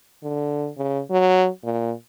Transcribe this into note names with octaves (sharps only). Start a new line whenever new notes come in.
D3
C#3
F#3
A#2